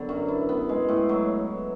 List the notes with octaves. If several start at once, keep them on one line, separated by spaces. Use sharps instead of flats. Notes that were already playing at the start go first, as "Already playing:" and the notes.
Already playing: D3 F#3 B3
F#2
E4
B3
G#3
A2
F#3